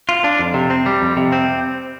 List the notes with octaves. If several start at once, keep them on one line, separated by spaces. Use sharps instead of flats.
F4
D4
F2
C3
C4
G3
F2
C3
C4